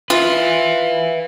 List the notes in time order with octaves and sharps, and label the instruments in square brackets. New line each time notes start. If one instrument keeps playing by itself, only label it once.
[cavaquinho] F4 [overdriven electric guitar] B4 E5